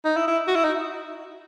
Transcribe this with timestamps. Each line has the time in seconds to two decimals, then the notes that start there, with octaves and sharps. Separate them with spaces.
0.05 D#4
0.17 E4
0.27 E4
0.47 F#4
0.55 E4
0.64 D#4